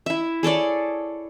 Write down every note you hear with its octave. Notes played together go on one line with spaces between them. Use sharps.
E4 E5
G#4 A4 C#5 D5